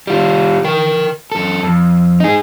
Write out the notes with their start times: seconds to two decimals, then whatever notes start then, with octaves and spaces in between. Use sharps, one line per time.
0.07 G3 F4
0.65 A#4 G5
1.32 F#2 A4
1.63 F2
2.20 D#4 G#4